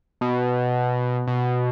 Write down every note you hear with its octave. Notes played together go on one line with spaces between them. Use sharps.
B2
B2